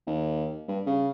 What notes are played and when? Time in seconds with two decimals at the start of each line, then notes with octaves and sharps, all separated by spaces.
0.07 D#2
0.68 G2
0.87 C#3